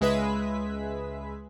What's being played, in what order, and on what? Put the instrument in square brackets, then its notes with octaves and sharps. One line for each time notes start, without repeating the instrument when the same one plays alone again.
[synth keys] C#2 G#3 G#4 B4 E5 B6